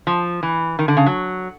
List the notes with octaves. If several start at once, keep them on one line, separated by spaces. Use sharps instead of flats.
F3
E3
D#3
D3
C#3
F#3